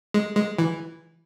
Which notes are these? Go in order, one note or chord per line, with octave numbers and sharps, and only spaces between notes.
G#3
G#3
E3